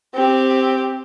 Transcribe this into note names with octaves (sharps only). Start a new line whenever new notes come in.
C4 G4